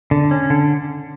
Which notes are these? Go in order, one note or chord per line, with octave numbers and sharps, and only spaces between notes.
D3
C#4
D3